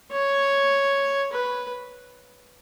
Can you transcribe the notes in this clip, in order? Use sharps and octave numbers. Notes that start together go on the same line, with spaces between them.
C#5
B4